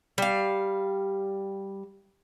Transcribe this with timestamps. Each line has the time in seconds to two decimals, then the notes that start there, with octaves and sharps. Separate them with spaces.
0.18 G3 F5